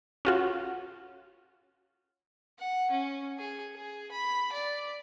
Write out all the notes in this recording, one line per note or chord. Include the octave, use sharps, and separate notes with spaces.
C#4 F4 F#4
F#5
C#4
G#4
G#4
B5
D5